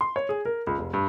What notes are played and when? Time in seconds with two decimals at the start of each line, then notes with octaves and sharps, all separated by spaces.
0.01 C6
0.16 C#5
0.29 G#4
0.45 A#4
0.67 C#2
0.78 F1
0.93 G2